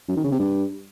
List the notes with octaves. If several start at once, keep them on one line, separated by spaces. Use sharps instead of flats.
F#2
D#3
C#3
C3
G2